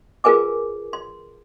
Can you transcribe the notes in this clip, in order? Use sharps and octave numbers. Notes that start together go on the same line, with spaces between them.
F4 G#4 A#4 B4 G#5 D6
C6